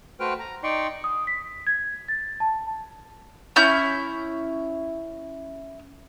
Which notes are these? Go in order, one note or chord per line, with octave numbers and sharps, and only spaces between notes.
A3 F#4 B4 C5 G5 F6
A#5
D#4 D5 G5 C6 C#6
D#6
B6
G#6
A6
A5
C#4 E4 G6